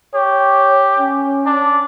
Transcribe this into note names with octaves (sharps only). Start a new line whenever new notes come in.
G4 C#5
C#4
D4